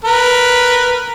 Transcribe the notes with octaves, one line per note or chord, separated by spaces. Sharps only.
A#4 B4